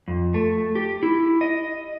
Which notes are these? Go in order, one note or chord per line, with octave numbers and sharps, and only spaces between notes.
F2
A3
G4
E4
D#5